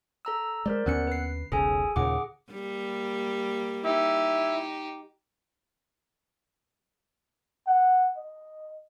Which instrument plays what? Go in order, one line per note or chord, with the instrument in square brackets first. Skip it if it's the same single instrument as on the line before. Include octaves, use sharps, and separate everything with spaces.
[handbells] A4 A#5 E6
[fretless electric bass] G#3 [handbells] A#4 C5 D5
[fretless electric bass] D#2 D3 C#4 [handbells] B3 F#6 C#7
[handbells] B4 C7
[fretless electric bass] E1 B1 C#3 [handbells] G#4 A4 G#5
[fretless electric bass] D#2 A#2 C#3 [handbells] G#4 F#5 D6
[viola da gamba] G3 A#3
[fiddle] D#4 G4 [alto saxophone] E4
[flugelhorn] F#5
D#5